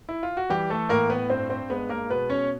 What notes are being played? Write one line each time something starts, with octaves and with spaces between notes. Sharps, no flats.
E4
F4
F#4
E3 G3 G4
A3 A4
A2 A#3 A#4
B3 B4
G2 C4 C5
C4 C5
G#3 B3 B4
A#3 A#4
B2 B3 B4
C#4 C#5